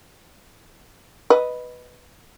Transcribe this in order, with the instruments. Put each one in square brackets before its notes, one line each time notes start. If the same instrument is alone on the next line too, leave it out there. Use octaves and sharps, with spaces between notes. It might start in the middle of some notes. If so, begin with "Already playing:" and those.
[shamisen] B4 D#5